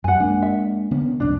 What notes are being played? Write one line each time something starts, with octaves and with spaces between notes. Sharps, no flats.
F#2 F#5 G#5
G#3 A#3 D4
E5
D3 B3 C#4
F1 C2 D4